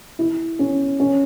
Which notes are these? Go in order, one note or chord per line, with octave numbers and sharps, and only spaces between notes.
E4
C#4
C#4